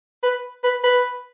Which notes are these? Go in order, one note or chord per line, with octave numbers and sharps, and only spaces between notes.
B4
B4
B4